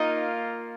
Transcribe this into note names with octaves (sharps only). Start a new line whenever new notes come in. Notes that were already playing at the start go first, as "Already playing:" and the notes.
Already playing: A#3 D#4 F4 D#5